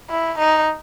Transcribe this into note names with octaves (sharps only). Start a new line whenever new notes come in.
E4
D#4